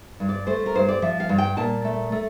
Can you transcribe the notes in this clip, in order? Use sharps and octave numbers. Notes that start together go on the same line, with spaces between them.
G2
D5
A3 C5
A#4
G2 C5
D5
F3 E5
F5
G2
G5
A#2 A5
A3
A3